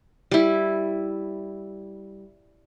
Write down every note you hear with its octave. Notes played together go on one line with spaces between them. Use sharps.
G3 E4